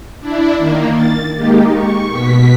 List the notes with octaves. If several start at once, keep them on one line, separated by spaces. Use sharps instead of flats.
D4 E4
D#3 A#3
A6
G#3 A#3 D#4 G4
C#6
B2 B6